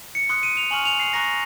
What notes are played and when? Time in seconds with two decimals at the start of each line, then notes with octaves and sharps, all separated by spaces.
0.15 C#7
0.29 C6 D#6 F#6 C#7
0.43 D#7
0.57 F7
0.71 G#5 C#6 F6 F#7
0.85 F7
1.00 C7
1.13 A#5 C#6 F#6 A#6